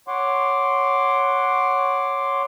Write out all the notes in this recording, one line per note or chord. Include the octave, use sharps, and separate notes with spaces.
C#5 F#5 C6 D6